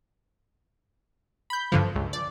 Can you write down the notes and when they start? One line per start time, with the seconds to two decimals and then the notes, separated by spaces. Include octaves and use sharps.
1.50 B5 G6
1.72 G2 D3 F3
1.95 C#2
2.13 D5